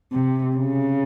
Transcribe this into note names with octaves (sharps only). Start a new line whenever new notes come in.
C3
C#3